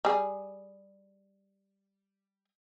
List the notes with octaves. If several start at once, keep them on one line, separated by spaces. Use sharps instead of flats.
G3 G#4